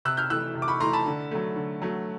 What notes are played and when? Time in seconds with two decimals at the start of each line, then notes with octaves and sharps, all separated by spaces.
0.05 C3 E6 F#6
0.17 F6 G6
0.30 E3 A3 E6 F#6
0.55 C3
0.62 D6
0.68 B5 C#6
0.80 E3 A3 A#5 C6
0.93 A5 B5
1.06 D3
1.31 F#3 A3
1.56 D3
1.82 F#3 A3